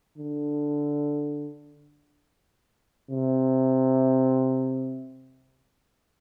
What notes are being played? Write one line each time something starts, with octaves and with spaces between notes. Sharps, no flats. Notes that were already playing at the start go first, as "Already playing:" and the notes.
D3
C3